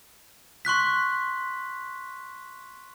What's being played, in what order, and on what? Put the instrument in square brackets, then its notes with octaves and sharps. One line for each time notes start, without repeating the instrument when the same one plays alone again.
[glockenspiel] C6 C#6 F#6 B6